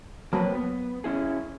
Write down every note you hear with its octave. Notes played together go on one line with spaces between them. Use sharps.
F#3 A#3 C4 B4
B3
C#4 E4 G#4